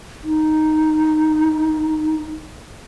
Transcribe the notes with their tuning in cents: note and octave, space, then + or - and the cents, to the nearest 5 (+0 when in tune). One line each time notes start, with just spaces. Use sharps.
D#4 +0